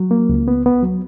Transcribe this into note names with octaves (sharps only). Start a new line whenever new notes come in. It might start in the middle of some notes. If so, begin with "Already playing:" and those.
Already playing: F#3
A#3
C#2
B3
B3
F#3